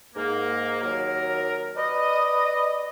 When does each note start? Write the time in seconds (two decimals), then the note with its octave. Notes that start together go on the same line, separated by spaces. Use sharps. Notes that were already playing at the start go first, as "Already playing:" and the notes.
0.13 G#2 A#3
0.80 D#2 F#3 A#4
1.76 B4 D5 D#5